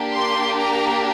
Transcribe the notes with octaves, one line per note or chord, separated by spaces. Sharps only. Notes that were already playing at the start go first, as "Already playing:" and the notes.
Already playing: A#3 D4 G4
C6
A#5